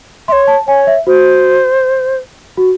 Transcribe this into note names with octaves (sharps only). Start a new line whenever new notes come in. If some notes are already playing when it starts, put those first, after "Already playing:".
E5 C6
C#5
A5
C#5 G#5
E5
F#4 C5
F#4